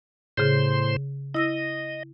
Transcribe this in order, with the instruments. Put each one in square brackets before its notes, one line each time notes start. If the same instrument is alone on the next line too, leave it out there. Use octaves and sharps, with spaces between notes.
[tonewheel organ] A2 C5 C6 [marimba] C#3 G#4 C#5
[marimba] E4 E6 A#6 [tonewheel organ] D#5